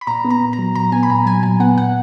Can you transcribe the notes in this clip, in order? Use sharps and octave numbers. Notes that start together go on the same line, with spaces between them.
B5
A#2 A#5
B3
A#5
A#2
A#5
F#3
A#2 A#5
B3 G#5
B5
A#2 A#5
F#3 G#5
A#2 G#5
B3 F#5
A#2 F#5